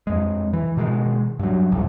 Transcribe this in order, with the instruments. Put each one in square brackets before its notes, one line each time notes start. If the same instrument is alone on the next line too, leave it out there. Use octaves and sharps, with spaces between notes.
[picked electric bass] F2 G#3
E3
B2 D#3 F3 G#3
G2 F#3
F#1 C2 F2